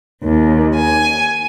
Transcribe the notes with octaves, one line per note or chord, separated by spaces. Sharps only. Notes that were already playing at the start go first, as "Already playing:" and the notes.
D#2
G#5